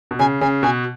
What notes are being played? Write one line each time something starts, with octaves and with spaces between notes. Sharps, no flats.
B2
C#3 G#5
C#3 G#5
B2 G#5